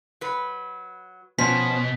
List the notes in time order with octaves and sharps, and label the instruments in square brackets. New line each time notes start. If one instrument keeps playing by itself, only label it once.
[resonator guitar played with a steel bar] F#3 B4
[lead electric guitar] B2 [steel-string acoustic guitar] F3 [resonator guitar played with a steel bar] C#4 [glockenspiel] B6